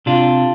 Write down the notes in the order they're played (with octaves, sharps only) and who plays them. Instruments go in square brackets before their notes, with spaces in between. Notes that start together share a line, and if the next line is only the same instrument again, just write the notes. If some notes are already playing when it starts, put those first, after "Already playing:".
[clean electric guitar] C3 D4 F4